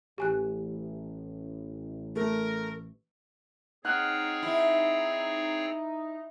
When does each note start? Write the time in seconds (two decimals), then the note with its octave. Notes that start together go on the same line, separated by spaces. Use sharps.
0.18 A1 G4 G#5 F#6
2.16 A3 A#4
3.85 C4 D#4 G#4 C#5 F#5 F6 F#6
4.43 E4